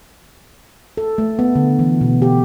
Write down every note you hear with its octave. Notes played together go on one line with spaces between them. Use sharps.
A4
A3
B3
D3
E3
B2
G4